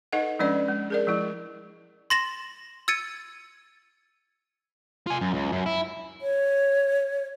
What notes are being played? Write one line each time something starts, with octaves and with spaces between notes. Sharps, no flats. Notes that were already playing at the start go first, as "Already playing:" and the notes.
D#4 A4 B4 D#5 F#5
F3 G#3 C#4 D4 B4 D5
G#3
G#4 A#4 D5
F3 G#3 E4
C6 A6 A#6 E7 F#7
E6 G#6 A6 C#7 D#7
F4 G#5
F#2
C#2
F#2
E4
C#5